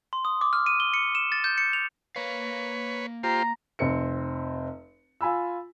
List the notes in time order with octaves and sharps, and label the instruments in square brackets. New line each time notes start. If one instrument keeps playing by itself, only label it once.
[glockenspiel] C6
D#6
D6
F6
D#7
G7
C#7
E7
A6
G6
C#7
F7
[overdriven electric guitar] A#3 F5 [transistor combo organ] B4 C#5
[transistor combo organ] F4 G4 C5 [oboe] A#5
[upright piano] F1 C4 C#7
F4 G#5 B5 E6